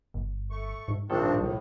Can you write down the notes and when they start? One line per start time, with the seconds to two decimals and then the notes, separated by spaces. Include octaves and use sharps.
0.14 G1
0.51 A3 C#6
0.88 G#2
1.10 A#1 G2 D#3 C4 D4 A4
1.38 C2 A2